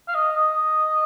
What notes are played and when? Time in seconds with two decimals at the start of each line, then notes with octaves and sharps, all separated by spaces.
0.08 F5
0.15 D#5
0.37 D#5